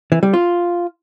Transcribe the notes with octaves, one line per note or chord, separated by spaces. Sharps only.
E3
G3
F4